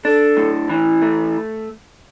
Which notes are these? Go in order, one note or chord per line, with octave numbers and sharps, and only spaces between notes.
D4 A4
A2
E3
A3